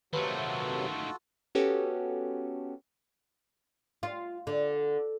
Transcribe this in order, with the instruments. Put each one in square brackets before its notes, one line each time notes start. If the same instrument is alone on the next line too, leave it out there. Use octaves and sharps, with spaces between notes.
[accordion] C3 F#3 [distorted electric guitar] D#3 A3 [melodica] F4 F#4 A4 [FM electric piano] B4
[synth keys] B3 C#4 F#4 G4 A4
[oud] F4
D3